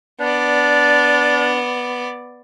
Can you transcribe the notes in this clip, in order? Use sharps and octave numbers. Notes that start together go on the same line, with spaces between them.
B3 D4 D5